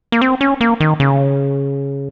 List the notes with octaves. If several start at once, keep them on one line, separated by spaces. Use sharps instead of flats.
A#3
C4
C#4
A#3
D#3
C#3